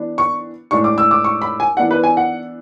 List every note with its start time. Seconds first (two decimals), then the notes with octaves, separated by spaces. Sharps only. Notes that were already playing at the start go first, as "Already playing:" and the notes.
Already playing: E3 B3 D4
0.18 C#6
0.71 A2 G#3 D4 C#6
0.84 D6
0.98 E6
1.11 D6
1.24 C#6
1.42 B5
1.60 G#5
1.77 E3 B3 D4 F#5
1.91 B4
2.04 G#5
2.17 F#5